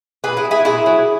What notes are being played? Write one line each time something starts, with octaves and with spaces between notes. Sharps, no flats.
A#2 G#4 B4
E4 G#4
F#3
E4 G#4
A#2 E4 G#4
F#3